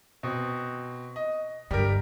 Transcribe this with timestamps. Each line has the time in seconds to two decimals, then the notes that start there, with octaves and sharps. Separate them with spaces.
0.23 B2 C4
1.16 D#5
1.71 G2 D3 G3 G4 A#4